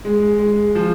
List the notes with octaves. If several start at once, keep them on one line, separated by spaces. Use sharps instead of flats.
G#3
G#3
F3